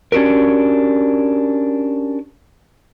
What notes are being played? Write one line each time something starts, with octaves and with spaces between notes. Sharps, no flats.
C#4 D4 F#4 G4 A#4